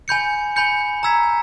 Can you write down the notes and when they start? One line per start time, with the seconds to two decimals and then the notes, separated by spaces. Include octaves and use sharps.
0.08 G#5 B5 G6 C#7
0.56 G#5 B5 G6 C#7
1.03 A#5 E6 G#6 B6